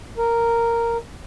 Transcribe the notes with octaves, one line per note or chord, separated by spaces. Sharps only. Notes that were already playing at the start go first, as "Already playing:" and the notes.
A#4